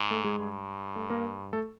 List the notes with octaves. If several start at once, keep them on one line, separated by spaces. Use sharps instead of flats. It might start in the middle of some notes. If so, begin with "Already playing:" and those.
Already playing: G#2
A3 A4
G#3 G#4
G2
A3 A4
A#3 A#4
A3 A4